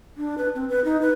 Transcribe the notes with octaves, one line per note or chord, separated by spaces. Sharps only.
D4
B4
C4
B4
D#4
B4